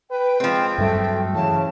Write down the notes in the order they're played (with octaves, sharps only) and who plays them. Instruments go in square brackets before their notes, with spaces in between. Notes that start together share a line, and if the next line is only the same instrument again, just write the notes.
[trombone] B4 [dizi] G5
[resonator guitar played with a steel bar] F3 C4 [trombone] G#3
[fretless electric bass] G2 F#3 [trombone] A3
[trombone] C#3 [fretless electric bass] E3 [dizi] A5